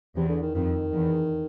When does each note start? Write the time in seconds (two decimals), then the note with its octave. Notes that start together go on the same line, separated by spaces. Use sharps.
0.16 E2 C3
0.29 D3
0.42 D#3
0.55 F2 D#3
0.93 E2